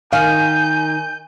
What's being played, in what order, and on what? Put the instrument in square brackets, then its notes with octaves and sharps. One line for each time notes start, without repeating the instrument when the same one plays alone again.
[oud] D#3 [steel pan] F5 [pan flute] G#5 [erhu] G6